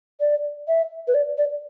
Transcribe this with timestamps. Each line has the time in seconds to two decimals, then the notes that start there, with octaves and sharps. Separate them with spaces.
0.20 D5
0.68 E5
1.08 B4
1.14 D5
1.38 D5